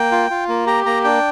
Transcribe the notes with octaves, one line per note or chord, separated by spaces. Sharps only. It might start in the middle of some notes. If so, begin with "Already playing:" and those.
Already playing: A#3 G5
F4
F4
A#3
G4 A#5
A#3 A#5
D4 G5